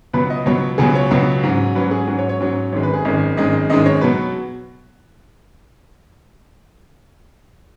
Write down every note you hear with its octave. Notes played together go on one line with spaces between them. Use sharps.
C#2 B2 F#3 B3 B4
D#5
C#2 B2 F#3 B3 C#5
C#2 B2 F#3 B3 G#4
C#5
C#2 B2 F#3 B3
G#2 F#3 C#4
G#2 F#3 C#4 B4
G#4
G#2 F#3 C#4 F#4
C#5
C#5
G#2 F#3 C#4
G#1 F#2 D#3 G#3 C#5
B4
G#4
G#1 F#2 D#3 G#3 D#5
G#1 F#2 D#3 G#3 D#5
G#1 F#2 D#3 G#3 D#5
C#5
B2 F#3 B3 B4